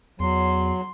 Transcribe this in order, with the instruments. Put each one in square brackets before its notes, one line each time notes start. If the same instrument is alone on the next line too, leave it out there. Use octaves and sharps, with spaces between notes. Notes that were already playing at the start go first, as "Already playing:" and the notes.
[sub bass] E2 [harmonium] F#3 [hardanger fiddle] C6